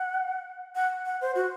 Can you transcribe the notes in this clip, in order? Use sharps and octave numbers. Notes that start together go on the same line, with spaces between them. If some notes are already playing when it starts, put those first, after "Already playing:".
Already playing: F#5
F#5
F#5
C5
F#4